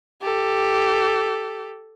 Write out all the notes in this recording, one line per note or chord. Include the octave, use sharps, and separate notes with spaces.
G4 A4